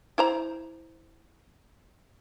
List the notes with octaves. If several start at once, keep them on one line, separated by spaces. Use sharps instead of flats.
E4 C5 A#5